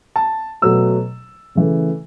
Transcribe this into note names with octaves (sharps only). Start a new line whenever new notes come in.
A5
B2 F#3 A3 E6
C#3 E3 A3